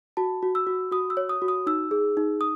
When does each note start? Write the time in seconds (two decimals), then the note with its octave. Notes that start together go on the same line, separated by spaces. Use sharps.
0.17 F#4 A5
0.43 F#4
0.55 E6
0.67 F#4
0.91 F#4 D#6
1.10 E6
1.17 C#5
1.29 D#6
1.42 F#4
1.48 D#6
1.67 D#4 E6
1.91 G#4
2.17 D#4
2.41 D#6